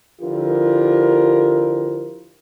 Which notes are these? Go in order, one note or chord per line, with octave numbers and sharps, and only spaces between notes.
D3 F3 E4 F4 G4 A#4